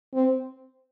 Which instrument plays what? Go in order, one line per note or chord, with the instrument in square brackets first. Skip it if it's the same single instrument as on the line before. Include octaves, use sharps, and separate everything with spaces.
[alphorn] C4